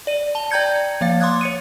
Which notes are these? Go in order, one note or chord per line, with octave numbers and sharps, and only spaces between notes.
D5 D#7
A5 G7
D5 G5 A#5 G6 G#6 C#7
F3 A#3 F5 A6
C6 D6 D#6 F#6 G#6
C#5 C#7 D#7